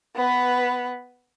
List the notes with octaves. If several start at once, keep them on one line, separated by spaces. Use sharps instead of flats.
B3 B4